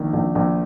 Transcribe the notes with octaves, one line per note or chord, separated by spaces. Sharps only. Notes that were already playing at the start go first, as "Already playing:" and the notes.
Already playing: A#1 D#3
A#1
A#1